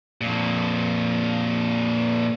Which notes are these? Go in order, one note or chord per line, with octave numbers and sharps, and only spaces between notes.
F2 A#2